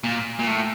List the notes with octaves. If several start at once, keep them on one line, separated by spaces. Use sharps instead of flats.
A#2
A#2
A2